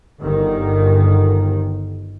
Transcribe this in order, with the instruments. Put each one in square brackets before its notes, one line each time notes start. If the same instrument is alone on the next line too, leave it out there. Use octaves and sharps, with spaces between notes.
[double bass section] G1 D#3